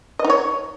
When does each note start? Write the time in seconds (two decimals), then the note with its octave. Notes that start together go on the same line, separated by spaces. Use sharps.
0.19 D#5
0.25 D#4
0.30 C#5